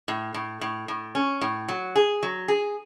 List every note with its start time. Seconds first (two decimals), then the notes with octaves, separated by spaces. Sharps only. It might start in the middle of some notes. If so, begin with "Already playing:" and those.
0.08 A2
0.34 A2
0.61 A2
0.88 A2
1.15 C#4
1.41 A2
1.68 F#3
1.95 G#4
2.23 F#3
2.48 G#4